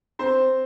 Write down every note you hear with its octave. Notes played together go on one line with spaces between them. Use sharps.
C4 C5